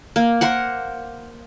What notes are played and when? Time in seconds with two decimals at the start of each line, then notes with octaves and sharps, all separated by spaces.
0.16 A#3
0.41 A#4 C5 F#5